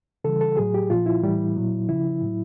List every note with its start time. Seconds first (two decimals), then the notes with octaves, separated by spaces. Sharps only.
0.24 C#3 E3 G3 A4
0.41 A4
0.57 A2 F#3 G#4
0.74 G4
0.90 A#2 F3 F4
1.06 E4
1.23 A2 E3 G3
1.56 A#2 F#3
1.89 C#3 F3 E4
2.21 A2 F#3